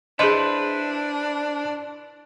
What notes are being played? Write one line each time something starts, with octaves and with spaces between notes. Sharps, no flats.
D4 E4 G#4 B4 C5 D#5 C6